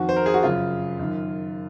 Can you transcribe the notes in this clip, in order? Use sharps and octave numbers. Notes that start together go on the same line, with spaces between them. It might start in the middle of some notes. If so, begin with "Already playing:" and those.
Already playing: F2 D#3 F#4
C5
A#4
G#4
F#4
F#2 C#3 F4
F#2 D#3